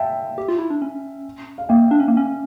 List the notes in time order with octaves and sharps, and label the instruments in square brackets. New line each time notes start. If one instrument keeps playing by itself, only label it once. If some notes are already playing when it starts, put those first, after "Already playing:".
Already playing: [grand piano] E5 F5 G5 A5
[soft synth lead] G4
F4
E4
D4
C#4
[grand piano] F5
[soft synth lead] A#3 [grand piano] E5 G5
[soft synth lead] D4
C#4
A#3
C#4